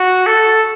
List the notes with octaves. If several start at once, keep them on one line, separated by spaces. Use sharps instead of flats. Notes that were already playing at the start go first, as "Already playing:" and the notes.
Already playing: F#4
A4